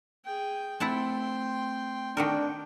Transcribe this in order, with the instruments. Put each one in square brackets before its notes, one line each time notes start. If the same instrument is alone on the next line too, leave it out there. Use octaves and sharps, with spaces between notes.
[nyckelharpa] G#4 G5
[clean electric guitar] A3 C4 [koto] E4 F#5 A5 [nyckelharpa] G5 C6
[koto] D#3 F#4 A#4 [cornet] D4 [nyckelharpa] G5